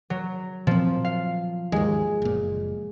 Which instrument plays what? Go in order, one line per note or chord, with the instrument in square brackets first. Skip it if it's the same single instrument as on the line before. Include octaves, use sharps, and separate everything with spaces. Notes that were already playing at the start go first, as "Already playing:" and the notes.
[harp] F#3
[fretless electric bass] A#2 C4 [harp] F3
[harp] F5
[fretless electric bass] D#2 G#2 [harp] G#3
[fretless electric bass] F#1 A#2